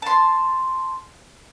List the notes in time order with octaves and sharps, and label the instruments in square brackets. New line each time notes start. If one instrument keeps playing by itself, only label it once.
[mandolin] A5 C6